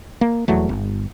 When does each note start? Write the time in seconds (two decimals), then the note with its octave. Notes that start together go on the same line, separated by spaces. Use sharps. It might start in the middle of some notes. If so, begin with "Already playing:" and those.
0.21 A#3
0.48 D#1 E2 F#3 A3
0.69 G1